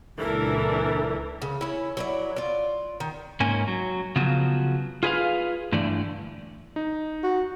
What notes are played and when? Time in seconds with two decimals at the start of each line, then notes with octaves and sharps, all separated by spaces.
0.19 C#2 A#2 E3 D4 A4 A#4
1.42 C#3
1.61 C#4 E4
1.97 F#3 E4 D5
2.36 F4 D5
3.00 D#3
3.40 G#2 A#3 C#4 G#5
3.68 F#3
4.16 C#3 F3 F#3 B3
5.03 F4 G#4 B4 D5 F5
5.72 G2 D3 E3 A3 D5
6.76 D#4
7.24 F#4